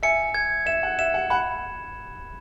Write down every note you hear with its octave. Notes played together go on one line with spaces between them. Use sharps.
E5 G#5 C#7
G#6
E5 E7
F#5
E5 E7
F#5
F#5 B5